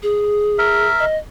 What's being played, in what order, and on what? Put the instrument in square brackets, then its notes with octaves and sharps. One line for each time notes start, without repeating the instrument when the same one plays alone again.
[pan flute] G#4
[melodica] A#4 E5
[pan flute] D#5